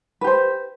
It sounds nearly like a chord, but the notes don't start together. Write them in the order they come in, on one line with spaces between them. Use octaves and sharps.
B4 G4 C5